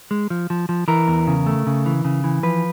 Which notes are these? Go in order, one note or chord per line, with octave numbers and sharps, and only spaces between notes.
G#3
F3
F3
F3
E3 A#4
E2
C#3
A3
C#3
E3
C#3
E3
F3 B4